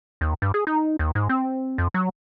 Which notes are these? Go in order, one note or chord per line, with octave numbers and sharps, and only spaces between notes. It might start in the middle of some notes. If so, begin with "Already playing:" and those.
D#2
G2
G#4
D#4
D#2
G#2
C4
F2
F#3